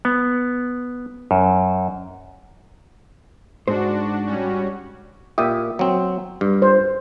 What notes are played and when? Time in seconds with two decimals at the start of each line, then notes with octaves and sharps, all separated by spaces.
0.05 B3
1.31 F#2
3.68 G#2 D4 F#4 C5
4.26 G3 C#4 F#4
5.38 A#2 G4 E5 D#6
5.79 F#3 C4
6.41 G2
6.62 C5